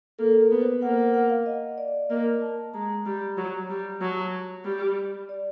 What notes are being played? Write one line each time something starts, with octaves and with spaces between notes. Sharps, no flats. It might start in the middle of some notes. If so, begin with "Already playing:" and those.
A#3 A4
A#4
B3 B4
C5
A#3 F#5
F#5
F#5
F5
D#5
D5
A#3 D#5
A5
G#3 A#5
G3
F#3
G3
F#3 A5
G3
D5